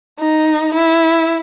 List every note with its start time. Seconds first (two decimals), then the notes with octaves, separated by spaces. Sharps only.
0.20 D#4
0.74 E4